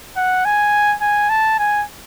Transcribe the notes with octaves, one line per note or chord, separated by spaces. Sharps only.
F#5
G#5
G#5
A5
G#5